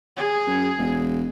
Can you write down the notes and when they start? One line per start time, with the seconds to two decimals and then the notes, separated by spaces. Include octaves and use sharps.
0.17 G#4
0.47 F#2
0.78 E1